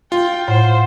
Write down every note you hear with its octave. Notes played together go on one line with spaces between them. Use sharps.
F4 G5
A2 C5 F#5